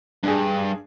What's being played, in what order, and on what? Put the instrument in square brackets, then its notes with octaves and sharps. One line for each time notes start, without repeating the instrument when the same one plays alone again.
[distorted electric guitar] G2 [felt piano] D4 G#4